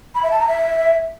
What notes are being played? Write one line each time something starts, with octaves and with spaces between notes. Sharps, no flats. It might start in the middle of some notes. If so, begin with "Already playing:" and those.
B5
E5
A5
A#5
E5